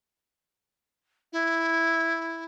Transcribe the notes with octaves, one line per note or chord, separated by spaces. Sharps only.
E4